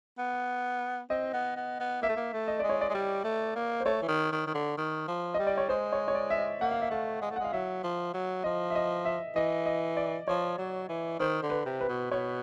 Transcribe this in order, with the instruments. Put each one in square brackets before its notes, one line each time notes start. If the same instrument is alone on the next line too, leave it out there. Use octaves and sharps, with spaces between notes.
[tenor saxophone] B3
[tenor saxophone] C4 [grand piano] D#5
[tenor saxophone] B3
B3
B3
[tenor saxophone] A#3 [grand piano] E5
[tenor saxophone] A3
A#3
A3
[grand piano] D#5
[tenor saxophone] G#3 [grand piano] D5
[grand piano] C#5
D5
[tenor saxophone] G#3
G3
A3
A#3
[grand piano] C5
[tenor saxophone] A3 [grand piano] C#5
[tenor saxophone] E3
D#3
D#3
D#3
D3
D#3
F3
[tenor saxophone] G3 [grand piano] D#5
[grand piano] D5
C#5
[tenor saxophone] G#3 [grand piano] C5
[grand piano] C#5
C#5
D5
E5
D#5
[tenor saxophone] A#3 [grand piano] F#5
[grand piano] F5
E5
[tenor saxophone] A3 [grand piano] F5
[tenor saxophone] G#3
A3
[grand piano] F#5
[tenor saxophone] G#3 [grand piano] F5
[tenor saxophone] F#3 [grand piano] E5
[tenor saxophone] F3
F#3
[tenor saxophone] F3 [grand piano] D#5
[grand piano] E5
D#5
E5
[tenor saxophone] E3 [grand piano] D#5
[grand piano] D#5
D5
[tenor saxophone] F3 [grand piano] C#5
[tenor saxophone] F#3
E3
[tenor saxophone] D#3 [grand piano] C5
[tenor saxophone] D3
[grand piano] B4
[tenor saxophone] C3
[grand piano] B4
[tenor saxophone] B2
[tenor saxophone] B2 [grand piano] C#5